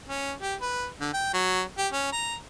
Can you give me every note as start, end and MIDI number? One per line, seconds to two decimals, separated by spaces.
0.09 0.33 61
0.42 0.55 67
0.61 0.87 71
1.01 1.09 50
1.14 1.30 79
1.34 1.61 54
1.78 1.88 67
1.93 2.10 61
2.12 2.35 82